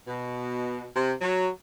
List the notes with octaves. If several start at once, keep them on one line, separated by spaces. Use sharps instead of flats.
B2
C3
F#3